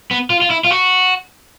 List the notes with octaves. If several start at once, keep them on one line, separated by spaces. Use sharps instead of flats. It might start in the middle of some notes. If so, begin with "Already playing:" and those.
B3
F4
F4
E4
F4
F#4